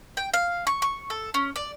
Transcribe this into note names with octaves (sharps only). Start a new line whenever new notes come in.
G5
F5
C#6
C#6
A4
C#4
D5